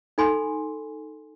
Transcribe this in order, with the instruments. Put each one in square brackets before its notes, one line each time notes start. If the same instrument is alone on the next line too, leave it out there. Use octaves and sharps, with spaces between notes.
[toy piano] D#4 A4 G#5 B5 C6